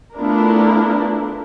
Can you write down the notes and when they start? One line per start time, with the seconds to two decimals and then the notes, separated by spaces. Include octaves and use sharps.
0.16 A3 B3 D4 E4 F4 A#4